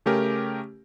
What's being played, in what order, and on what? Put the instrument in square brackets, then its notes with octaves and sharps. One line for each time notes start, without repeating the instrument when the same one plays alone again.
[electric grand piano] C#3 A3 C#4 G4 A#4